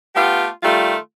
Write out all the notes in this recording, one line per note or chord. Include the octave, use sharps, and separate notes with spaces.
A3 B3 F4 G4
D#3 G3 A3 F4